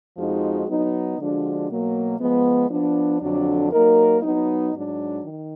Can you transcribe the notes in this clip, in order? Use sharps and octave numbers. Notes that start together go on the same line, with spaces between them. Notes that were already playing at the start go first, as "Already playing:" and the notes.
F2 F3 G#3 D#4 F#4
F#3 B3 D#4
D3 F3 G#3 D4 F#4
B2 F#3 A#3
F3 G#3 B3
F3 B3 D4
F2 D3 F#3 D4
F#3 A#3 D#4 A#4
F#3 B3 D#4
G#2 F#3 D4
D#3